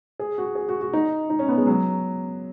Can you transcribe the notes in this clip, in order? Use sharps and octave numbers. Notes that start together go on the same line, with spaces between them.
G#4
F#4
G#4
F#4
F#4
D#4
D#4
C#4
B3
G#3
F#3